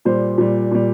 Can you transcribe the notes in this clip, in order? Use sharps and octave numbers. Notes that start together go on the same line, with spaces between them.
A#2 G3 C5
A#2 G3
A#2 G3